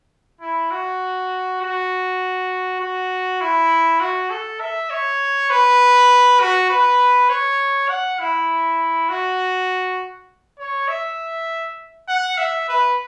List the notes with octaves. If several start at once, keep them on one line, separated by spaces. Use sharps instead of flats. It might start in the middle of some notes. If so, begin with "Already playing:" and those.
E4
F#4
F#4
F#4
E4
F#4
A4
E5
C#5
B4
F#4
B4
C#5
F#5
E4
F#4
C#5
E5
F#5
E5
B4